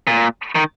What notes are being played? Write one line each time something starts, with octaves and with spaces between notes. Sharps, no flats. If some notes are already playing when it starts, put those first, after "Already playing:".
A#2
D#3